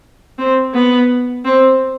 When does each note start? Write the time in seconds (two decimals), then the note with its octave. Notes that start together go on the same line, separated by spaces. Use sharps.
0.38 C4
0.74 B3
1.45 C4